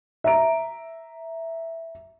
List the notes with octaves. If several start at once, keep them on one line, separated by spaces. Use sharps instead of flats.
E5 A#5 D7